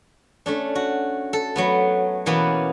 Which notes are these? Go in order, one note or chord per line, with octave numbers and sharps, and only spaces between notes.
A3 C#4 D4
F#4
A4
F#3 A3 B3
B2 E3 A#3 B3 C#4